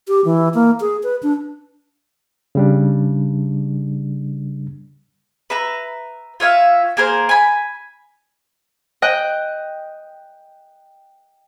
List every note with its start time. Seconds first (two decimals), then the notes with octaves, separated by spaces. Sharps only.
0.08 G4
0.25 E3
0.54 A#3
0.80 G#4
1.03 B4
1.23 D4
2.55 C#3 G3 D4
5.50 B4 E5 A#5
6.40 F4 C#5 E5 F5
6.97 A#3 G#4 A#4 C5
7.29 G#5 B5
9.02 D#5 G5 F#6